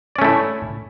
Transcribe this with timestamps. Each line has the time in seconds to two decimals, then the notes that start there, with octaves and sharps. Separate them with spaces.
0.16 D5
0.19 C#4
0.21 A3
0.24 E4